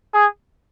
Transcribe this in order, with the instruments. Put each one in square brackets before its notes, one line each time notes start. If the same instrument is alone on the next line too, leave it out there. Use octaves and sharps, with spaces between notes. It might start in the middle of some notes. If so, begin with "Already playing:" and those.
[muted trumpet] G#4